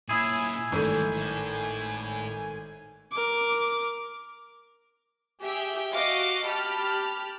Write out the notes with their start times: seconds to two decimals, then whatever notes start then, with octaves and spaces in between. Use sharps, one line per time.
0.09 A#2 C#4 E4 G#4 G#5
0.72 G#1 E3 G3 A3 D#7
1.13 A2
3.12 A#4 D6
5.43 G4 G#4 E5 G5
5.92 F#4 D#5 F5 D6 C#7
6.47 G4 A5 B5 F6